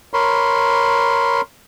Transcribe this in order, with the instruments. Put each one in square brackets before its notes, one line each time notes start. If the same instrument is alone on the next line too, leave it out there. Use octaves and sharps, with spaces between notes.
[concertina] A#4 C#5 B5 C6